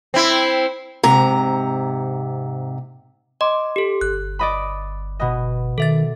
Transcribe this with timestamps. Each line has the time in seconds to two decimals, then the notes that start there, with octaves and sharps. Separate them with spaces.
0.14 C4 E4
1.03 G#2 C3 A#5
3.41 D#5 C6 D6
3.76 G4 A4
4.01 G1 F#6
4.39 D5 D#5 B5
5.20 B2 B3 D#5
5.78 D#3 A4 E5 A6